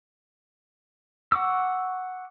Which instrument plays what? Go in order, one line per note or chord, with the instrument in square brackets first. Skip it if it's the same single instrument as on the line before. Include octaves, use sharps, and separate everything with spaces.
[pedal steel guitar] F#5 C#6 D6 E6